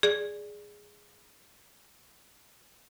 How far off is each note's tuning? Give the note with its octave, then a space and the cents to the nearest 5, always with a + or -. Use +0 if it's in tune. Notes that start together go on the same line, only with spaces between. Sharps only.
G#4 +0 D5 +0